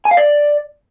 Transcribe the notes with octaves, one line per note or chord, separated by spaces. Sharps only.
G#5
F5
D5